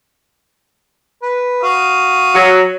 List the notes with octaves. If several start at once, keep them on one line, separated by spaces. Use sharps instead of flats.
B4
F#4 F5 D#6
F#3